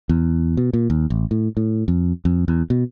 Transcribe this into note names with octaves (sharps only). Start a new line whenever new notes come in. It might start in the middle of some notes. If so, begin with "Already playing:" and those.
E2
B2
A#2
D#2
A1
A2
A2
F2
F2
E2
B2